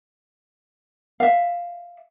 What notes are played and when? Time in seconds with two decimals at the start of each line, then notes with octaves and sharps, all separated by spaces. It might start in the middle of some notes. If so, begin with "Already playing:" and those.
1.20 E5 F5